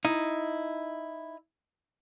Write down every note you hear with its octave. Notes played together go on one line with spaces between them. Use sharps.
D#4 E4